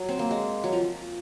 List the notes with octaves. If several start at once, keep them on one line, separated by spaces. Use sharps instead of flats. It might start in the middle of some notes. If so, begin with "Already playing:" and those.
Already playing: F#3
C4
A#3
G#3
F#3
F3